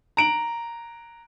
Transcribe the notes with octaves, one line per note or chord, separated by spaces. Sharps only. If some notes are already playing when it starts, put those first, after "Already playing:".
A#5 D7 F#7